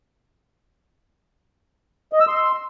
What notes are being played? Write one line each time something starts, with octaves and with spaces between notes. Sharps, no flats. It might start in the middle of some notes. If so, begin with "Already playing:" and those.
D#5
E6
C6